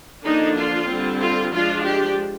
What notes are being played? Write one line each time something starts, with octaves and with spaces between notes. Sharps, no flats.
D3 F3 A#3 D4 D#4
F4
D3 G3 C4
F4
F3 G#3 D4 F4
G4